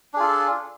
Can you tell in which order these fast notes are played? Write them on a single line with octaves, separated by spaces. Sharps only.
D4 G#4 F4 A4